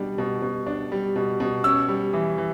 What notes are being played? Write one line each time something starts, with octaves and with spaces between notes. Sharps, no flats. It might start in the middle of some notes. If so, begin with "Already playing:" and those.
Already playing: B2 G3 D4
B2
B2
D4
G3
B2
B2
C#4 E6
G3
E3
E3